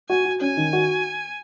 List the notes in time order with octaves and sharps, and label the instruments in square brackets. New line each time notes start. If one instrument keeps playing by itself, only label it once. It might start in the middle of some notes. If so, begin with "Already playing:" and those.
[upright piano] F#4 [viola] G#5
[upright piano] F#4
[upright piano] C#4 [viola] G#5
[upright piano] D#3
F#4